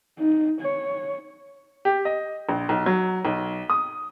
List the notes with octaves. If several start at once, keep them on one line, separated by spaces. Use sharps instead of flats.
D#4
C#5
G4
D#5
A#1
B1
F#3
B1
D#6